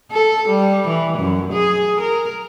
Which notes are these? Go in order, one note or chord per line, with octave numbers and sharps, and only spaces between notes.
A4
G3
E3
F#2
G#4
A#4